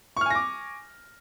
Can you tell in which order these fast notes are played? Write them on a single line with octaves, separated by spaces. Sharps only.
C#6 F6 G#5 A#6 D6